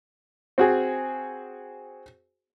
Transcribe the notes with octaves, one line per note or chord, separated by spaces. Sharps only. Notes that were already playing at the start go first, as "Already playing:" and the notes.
C4 F#4 G#4